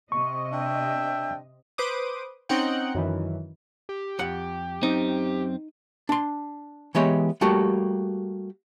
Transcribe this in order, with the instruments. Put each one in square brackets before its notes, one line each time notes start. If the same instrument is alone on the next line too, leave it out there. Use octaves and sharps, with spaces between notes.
[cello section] C3 D#5 [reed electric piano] C#6
[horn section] D4 E5 G5
[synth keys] B4 C5 D6 D#6
C4 C#4 D#4 F#5 G5
F#2 D#3 E3
[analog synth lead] G4
[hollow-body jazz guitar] F2 F#5
[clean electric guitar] F#2 C4 [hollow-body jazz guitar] D#4
[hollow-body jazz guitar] D4 C6
E3 G#3 B3 G4 C#5 D#5
G3 A3 A#3 F#4 G4